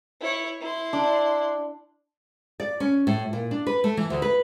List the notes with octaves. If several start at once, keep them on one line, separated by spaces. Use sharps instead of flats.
E4 C#5
E4 C6
D4
D5
C#4
A2
A#2
D4
B4
A3
E3
D2
B4